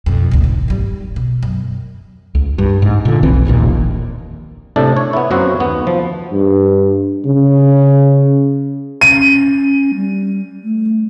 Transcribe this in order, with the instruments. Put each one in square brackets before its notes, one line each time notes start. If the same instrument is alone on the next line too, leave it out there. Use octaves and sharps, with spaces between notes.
[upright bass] F2 B2
G#1 D2
A2
G#1 G3
B2
F#2
[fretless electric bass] C#2
G2
G#2
A#2 D3
F1 B1 E3 C4
F1 A#1 D#2 A#2
[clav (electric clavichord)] A2 C3 D4 A4 D5
C#5
B3 E4
F#2 F#3 A#3 C4 F#4
D#2 B3
F3
[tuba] G2
C#3
[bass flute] C#4 [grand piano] D#7
[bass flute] G3
A3